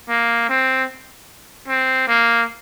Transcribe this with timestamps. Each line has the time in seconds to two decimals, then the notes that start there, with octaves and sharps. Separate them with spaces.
0.09 A#3
0.49 C4
1.68 C4
2.08 A#3